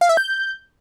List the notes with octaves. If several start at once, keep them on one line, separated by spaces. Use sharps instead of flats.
F5
E5
G6